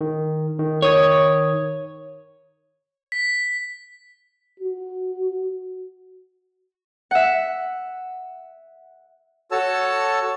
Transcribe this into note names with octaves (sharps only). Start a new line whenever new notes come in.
D#3
D#3
D#3 C#5 D#6 G#6
B6
F#4
E5 F#5
F#4 A4 C#5 A5 E6